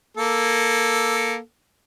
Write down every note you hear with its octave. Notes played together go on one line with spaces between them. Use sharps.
A#3 A4